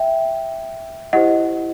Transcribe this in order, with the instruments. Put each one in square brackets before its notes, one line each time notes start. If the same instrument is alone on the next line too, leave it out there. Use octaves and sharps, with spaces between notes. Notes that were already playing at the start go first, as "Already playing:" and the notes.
Already playing: [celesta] E5 G5
E4 G4 C5 D#5 F#5